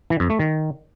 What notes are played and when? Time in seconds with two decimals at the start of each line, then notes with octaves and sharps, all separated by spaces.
0.10 E3
0.20 F2
0.30 A3
0.39 D#3